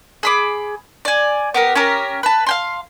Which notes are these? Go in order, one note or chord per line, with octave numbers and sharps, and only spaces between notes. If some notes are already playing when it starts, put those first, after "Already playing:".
G#4 B5 D6
D5 G#5
B3 G4 A#4
C#4 G4 A#4
B4 A5
F5 G5 C6